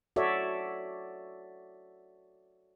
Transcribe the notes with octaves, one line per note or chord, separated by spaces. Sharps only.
F#4 A4 C#5 D5 E5